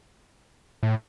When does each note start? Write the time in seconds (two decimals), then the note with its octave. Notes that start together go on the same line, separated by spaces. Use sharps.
0.83 A2